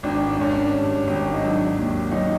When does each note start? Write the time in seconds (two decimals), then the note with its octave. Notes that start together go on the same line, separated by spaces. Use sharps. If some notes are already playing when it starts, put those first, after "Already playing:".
0.03 G#1 D4
0.27 D4
0.39 G#1 C#4
0.50 D4
0.73 G2
1.07 G#1
1.33 D#4
1.43 F#3 D4
1.77 D#2
2.12 F#3 C#4 D#4